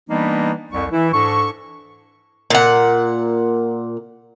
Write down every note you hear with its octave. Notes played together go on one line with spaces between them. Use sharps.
E3 G3 A#3 B3 D4 D#4
C2 F2 C#6
E3 E4
G#2 D4 A4 C#6
A#2 F#5